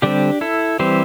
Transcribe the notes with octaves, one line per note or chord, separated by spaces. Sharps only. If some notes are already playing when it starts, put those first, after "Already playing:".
D3 G3 C4 D4 G4
E4 A4
E3 G3 C4 G4 C5